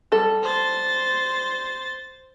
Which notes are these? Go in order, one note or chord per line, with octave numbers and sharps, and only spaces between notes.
G3 A4
C5 A6